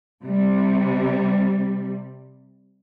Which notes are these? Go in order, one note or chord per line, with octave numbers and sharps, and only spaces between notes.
C3 G3